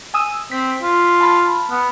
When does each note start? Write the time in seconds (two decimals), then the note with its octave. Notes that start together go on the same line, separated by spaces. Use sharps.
0.14 G#5 D#6 E6
0.52 C4 B6
0.82 F4
1.21 A5 B5 F6
1.71 B3